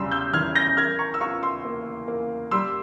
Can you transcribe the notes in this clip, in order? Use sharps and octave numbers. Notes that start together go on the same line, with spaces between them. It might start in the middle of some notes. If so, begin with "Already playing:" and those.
Already playing: E2 C#3 G3 C6 E6
E6 G6
E3 F6 G#6
G6 A#6
A#4 F6 G#6
A#5 C#6
E6
F4 A#5 C#6
C6 E6
A#3
A#3
G3 C6 E6